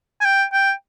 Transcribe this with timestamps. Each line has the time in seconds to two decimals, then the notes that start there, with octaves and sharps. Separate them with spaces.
0.21 G#5
0.25 G5
0.53 G5